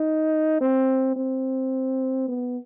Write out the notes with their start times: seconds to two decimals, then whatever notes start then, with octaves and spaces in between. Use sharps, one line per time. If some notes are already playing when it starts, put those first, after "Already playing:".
Already playing: D#4
0.61 C4
1.16 C4
2.28 B3